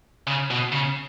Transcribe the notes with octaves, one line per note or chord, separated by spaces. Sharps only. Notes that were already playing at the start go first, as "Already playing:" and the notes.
C#3
B2
C#3